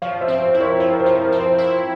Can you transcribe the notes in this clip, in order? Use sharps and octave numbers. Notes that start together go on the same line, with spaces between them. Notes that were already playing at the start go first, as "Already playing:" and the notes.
F3 C#5 F5
C5 E5
C4
C5
E4
A#4 C#5
F3 C5
A#4
C5
F3
A#4
C4
C5
E4